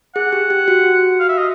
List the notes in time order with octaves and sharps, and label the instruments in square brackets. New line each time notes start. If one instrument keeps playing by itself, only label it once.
[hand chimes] G#4 [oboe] F#5
[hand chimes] G4
G4
F#4
[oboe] F5
E5
D#5